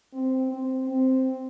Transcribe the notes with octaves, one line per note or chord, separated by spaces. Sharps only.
C4
C4
C4